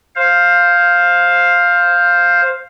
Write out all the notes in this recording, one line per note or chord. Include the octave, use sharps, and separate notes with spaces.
C5 F5